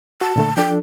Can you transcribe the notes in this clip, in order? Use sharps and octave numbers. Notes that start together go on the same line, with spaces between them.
F#4 A5
A#2 D3 A3
F3 D4 A4 G5